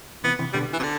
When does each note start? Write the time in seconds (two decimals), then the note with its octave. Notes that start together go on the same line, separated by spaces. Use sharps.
0.24 C3 E3 B3
0.39 C3 E3
0.53 B2 D3 G3
0.73 E3
0.79 C3
0.83 D3